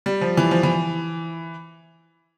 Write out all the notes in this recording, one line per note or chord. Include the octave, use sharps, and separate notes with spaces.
G3
F3
E3
F3
E3